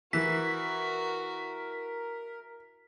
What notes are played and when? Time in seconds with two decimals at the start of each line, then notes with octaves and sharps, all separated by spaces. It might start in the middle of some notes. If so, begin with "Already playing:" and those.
0.13 E3 F#4 A#4 B6